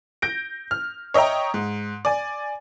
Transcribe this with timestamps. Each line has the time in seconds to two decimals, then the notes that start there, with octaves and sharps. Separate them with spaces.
0.22 G6 A#6 D7
0.71 F6
1.14 C#5 D#5 E5 G5 A#5
1.54 G#2
2.05 D5 G#5